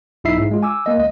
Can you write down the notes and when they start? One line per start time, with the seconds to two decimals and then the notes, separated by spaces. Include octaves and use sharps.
0.24 B1 G2 D#4 E4 E5 C7
0.38 G#2 G#3
0.51 G#3 F4
0.63 G#5 D6 E6
0.86 A#3 D#5
0.98 C#2 D#5